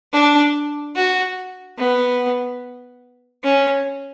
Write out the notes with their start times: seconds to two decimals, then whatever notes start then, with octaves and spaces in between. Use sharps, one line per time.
0.13 D4
0.95 F#4
1.78 B3
3.43 C#4